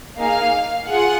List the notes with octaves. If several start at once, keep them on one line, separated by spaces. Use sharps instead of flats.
A#3 D#4 G#4 F5
F4 G#4 F#5